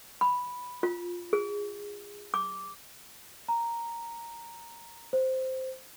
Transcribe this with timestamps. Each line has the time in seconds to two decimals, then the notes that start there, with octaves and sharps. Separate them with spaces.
0.21 B5
0.83 F4
1.33 G#4
2.34 D6
3.49 A#5
5.13 C5